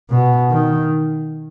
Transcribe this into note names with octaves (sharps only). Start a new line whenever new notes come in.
B2
D#3